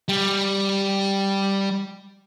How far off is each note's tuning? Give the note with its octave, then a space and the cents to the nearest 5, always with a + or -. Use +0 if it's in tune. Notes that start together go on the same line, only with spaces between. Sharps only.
G3 +0